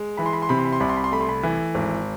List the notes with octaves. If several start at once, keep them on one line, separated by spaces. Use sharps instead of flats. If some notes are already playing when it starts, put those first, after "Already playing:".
Already playing: G#3
E3 B5
C6
B5
C6
C3 B5
C6
B5
C6
C2 B5
C6
B5
C6
A3 B5
C6
B5
E3
G#1